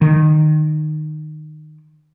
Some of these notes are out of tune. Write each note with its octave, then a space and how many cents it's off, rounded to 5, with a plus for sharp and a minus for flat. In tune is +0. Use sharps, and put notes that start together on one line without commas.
D#3 -20